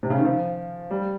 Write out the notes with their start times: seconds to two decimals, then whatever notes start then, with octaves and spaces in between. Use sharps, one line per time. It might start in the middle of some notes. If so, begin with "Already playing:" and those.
0.03 C3
0.10 C#3
0.18 D#3
0.25 F3
0.91 G3